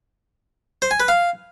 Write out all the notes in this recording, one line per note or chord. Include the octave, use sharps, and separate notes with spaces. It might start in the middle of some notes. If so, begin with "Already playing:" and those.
C5
G#5
B4
F5